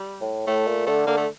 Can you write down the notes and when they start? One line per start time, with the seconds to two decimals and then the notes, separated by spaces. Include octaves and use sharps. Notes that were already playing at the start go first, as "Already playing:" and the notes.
Already playing: G3
0.21 A2
0.47 A2 A3
0.67 A#2
0.87 D3 A3
1.07 D3 A#3
1.17 A3